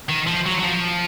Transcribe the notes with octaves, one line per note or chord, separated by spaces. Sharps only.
D#3
F3
F#3
F#3
F3